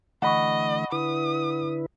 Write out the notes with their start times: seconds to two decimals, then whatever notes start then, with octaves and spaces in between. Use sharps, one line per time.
0.22 D3 E3 A3 D#5 F#5 B5 C#6
0.92 D3 E4 B4 D#6